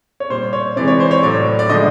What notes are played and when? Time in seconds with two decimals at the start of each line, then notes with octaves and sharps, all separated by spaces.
0.20 C#5
0.30 A#2 G3 C5
0.53 C#5
0.76 C3 E3 G#3 D5
0.88 C#5
1.00 C5
1.11 C#5
1.23 A2 F#3 D5
1.59 D5
1.70 D3 F3 G#3 D#5